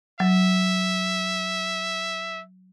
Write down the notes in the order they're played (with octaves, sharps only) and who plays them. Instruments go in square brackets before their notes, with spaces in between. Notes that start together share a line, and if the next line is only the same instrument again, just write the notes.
[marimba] F#3 [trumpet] E5